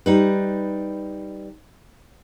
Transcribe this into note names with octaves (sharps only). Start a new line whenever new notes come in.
G3 D#4 B4